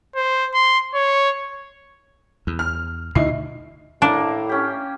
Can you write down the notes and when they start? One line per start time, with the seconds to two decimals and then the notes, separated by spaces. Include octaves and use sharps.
0.16 C5
0.54 C6
0.94 C#5
2.47 E2
2.59 F6
3.15 D2 B2 D3 D#4 E4 C7
4.02 A2 A#3 D4
4.49 C#4 G4